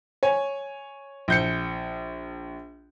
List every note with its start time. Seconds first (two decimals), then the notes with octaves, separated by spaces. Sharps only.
0.23 C#5 G#5
1.28 A#1 G6 C#7